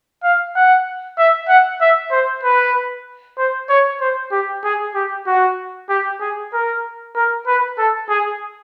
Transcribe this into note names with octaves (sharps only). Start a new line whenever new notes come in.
F5
F#5
E5
F#5
E5
C5
B4
C5
C#5
C5
G4
G#4
G4
F#4
G4
G#4
A#4
A#4
B4
A4
G#4